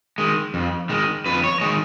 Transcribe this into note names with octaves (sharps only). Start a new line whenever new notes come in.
D#3 G#3
F2
D#3 G#3
F2 B4
C#5
D#3 G#3 D#5